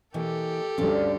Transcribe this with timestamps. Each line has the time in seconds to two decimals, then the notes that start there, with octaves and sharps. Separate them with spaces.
0.14 B2 E3 A#3 G4 A4
0.78 D2 G2 G3 A3 C#4 F4 D5